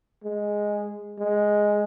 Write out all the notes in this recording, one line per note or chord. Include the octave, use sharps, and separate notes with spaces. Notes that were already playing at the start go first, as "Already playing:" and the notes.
G#3
G#3